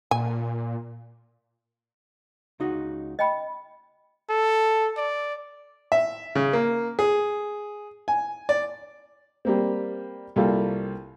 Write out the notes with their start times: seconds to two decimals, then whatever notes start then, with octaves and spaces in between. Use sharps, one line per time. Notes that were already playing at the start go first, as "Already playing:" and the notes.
0.11 A#2 G#5
2.60 C#2 D#4 F#4
3.19 D#5 G5 B5
4.30 A4
4.98 D5
5.92 E5
6.35 C#3
6.53 A#3
6.99 G#4
8.08 G#5
8.49 D5
9.45 G3 A#3 C4
10.36 C2 G3 A#3 F4 A4